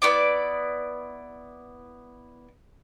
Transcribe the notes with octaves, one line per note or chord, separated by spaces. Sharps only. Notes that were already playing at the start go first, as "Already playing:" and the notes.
B3 E4 D5 D6